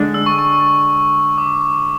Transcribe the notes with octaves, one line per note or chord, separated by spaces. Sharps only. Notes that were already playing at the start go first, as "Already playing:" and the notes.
Already playing: D3 G#3 D4
E6
C#6
C#6
D6